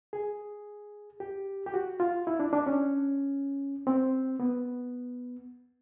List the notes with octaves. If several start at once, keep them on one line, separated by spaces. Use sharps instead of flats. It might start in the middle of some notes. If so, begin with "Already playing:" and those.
G#4
G4
G4
F#4
F4
E4
D4
D4
C#4
C4
B3